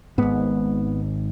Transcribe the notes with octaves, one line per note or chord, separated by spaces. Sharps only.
G#1 G#2 B3